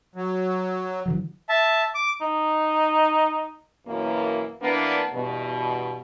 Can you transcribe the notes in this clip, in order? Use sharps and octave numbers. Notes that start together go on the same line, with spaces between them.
F#3
D3 E3 F#3
E5 A5
D6
D#4
F#2 B2 E3 A#3
E3 A#3 B3 D4
E2 G2 B2